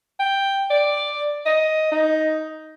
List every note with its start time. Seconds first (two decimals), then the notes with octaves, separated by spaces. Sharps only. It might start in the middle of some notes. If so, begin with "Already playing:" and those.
0.20 G5
0.70 D5
1.46 D#5
1.92 D#4